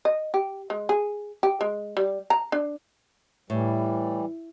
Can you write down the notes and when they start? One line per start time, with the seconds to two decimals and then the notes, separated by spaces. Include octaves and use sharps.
0.05 D#5
0.34 G4
0.70 G#3
0.89 G#4
1.43 G4
1.61 G#3
1.97 G3
2.30 A#5
2.52 D4
3.50 A2 E3 G3